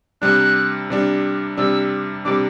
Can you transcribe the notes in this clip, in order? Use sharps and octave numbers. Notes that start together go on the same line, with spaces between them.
C3 G3 D4 F#6
C3 G3 D4
C3 G3 D4 E6
C3 G3 D4 D6